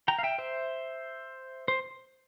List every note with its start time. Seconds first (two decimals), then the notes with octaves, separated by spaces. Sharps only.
0.08 G5 A#5
0.19 F5
0.23 E5 G5
0.38 C5 E5
1.68 C5